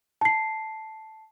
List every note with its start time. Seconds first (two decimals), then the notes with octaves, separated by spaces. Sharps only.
0.21 A5 C7